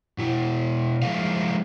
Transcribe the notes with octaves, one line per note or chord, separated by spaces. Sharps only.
B2 E4
F3 G#3 A#3 E4 F5